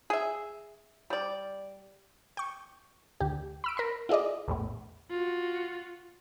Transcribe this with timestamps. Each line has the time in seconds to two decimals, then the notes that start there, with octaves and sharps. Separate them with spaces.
0.10 G#4 E5
1.10 G3 D5
2.37 G5 C#6
3.20 D2 G4
3.64 B5 E6 D7
3.77 A#4 B5 C6
4.09 E4 F4 G#4 D5 D#5
4.48 A#1 E2 A2
5.10 F4 F#4